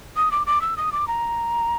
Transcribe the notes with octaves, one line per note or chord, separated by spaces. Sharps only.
D#6
D6
D6
E6
D#6
D6
A#5